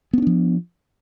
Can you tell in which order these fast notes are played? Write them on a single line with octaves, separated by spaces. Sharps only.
B3 C#4 D4 F3